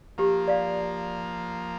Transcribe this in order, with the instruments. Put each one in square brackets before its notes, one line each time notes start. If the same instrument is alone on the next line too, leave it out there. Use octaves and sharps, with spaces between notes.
[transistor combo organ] F3 A#3 [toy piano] G4
[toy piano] D5 F5